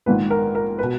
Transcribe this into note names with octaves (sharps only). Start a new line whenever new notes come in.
A#1 G#2 D#3 B4
A#4
A#4
B2 B4